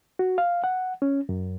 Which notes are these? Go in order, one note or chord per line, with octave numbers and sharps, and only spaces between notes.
F#4
F5
F#5
C#4
F#2